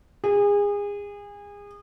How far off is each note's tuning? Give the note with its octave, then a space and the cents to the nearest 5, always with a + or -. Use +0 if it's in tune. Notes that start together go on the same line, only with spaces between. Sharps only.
G#4 -30